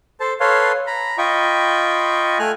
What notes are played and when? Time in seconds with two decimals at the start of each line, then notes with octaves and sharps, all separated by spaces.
0.20 A4 C5 A5
0.40 A4 B4 C#5 F5 C6
0.87 A#5 B5
1.18 F4 D#5 G5 B5 C#6
2.39 A3 G#5 F6 F#6